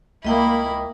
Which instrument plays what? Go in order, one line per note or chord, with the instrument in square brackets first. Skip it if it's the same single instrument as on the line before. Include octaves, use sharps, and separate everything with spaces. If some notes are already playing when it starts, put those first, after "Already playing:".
[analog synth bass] C#2 [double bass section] A#3 [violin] E4 B5 [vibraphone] D#5 G5 D#6